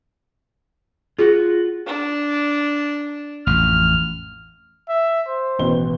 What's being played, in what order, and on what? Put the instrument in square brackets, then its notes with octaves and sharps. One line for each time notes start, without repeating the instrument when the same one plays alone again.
[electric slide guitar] F4 F#4 [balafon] G#4
[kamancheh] D4
[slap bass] A1 F2 [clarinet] F6
[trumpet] E5
C5
[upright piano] A1 B2 G7